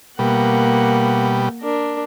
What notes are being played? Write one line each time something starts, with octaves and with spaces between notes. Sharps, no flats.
B2 G3 A#3 F#5
D4 A#4